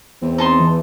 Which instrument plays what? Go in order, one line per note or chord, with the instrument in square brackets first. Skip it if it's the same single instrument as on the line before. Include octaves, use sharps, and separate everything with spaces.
[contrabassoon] E2 [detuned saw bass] C4
[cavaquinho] D#4 A5 C6
[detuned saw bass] E3